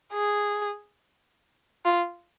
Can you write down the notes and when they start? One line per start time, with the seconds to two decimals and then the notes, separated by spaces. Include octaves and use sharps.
0.13 G#4
1.85 F4